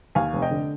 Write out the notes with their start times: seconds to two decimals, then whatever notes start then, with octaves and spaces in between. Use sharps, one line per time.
0.15 D#2 F5 G#5
0.33 F1
0.42 D#5 G5
0.51 D3